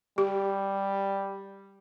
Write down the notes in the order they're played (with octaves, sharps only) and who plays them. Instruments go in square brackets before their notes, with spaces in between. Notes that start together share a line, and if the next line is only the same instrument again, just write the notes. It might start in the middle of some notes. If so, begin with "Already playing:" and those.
[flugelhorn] G3 [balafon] G4